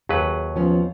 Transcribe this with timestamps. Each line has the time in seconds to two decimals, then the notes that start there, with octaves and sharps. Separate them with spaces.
0.09 D#2 F#3 G#4 B4
0.56 F3 B3 C#4